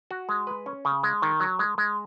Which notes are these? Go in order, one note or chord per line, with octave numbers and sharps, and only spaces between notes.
F#4
G#3
B4
C#4
C#3
G#3
D#3
F#3
G#3
G#3